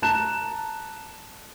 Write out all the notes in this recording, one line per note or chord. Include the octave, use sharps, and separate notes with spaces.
A5 A#5 F#6 E7